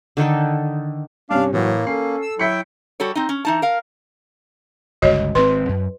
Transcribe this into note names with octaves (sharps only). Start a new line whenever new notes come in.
D3 D#3 D#4 A4
G2 C3 C#4 D4 F5
A2 E3 F#3 A#3
C#4 A4 C7
E6
F#3 E4 E5 G5 B6 C#7
G3 F#4 A4 C#5
C4 D#4
C#4
E3 D#4 A5
A#4 F5
G1 C#2 F#4 C#5 D#5
G#1 G#2 C4 B4 C6
F#2